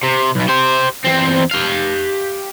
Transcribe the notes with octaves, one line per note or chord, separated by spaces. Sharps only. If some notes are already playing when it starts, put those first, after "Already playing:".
C3
B1 B2
G4 C5
E2 C4
G4 F5